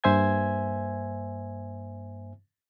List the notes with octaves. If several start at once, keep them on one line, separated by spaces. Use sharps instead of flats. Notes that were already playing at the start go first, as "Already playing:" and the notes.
G2 A#3 C5 E5 G#5 G#6